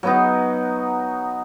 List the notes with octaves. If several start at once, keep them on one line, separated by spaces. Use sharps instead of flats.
F#3 B3 D#4